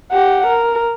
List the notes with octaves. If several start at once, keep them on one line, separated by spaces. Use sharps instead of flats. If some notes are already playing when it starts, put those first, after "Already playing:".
G4 F#5
A#4